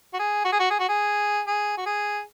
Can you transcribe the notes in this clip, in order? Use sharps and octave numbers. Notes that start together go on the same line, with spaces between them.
F#4
G#4
F#4
G#4
F#4
G#4
F#4
G#4
G#4
F#4
G#4